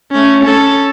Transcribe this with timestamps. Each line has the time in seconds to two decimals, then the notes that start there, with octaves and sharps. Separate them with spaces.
0.11 A3 C#4
0.43 C#4 A4